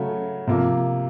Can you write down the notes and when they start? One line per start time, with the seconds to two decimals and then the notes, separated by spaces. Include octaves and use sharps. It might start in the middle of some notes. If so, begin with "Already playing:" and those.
Already playing: C#3 F#3 A3
0.47 C3 F3 A#3